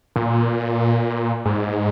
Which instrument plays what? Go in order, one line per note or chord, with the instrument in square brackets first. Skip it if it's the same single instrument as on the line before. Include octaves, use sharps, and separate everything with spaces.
[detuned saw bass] A#2
G#2